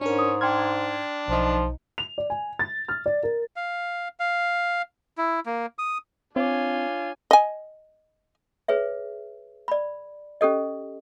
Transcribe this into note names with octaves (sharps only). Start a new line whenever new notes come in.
G#2 C#4 D4 A#4
D#6
D4 G5 C6 F6 G#6
B1 F3 D#4
F7
D5
G#5
A6
F6
D5
A#4
F5
F5
E4
A#3
D#6
C4 D4 F4 C#5 G#5 D6
D#5 G#5
G#4 B4 C#5 E5
D5 B5
C#4 G4 A4 D#5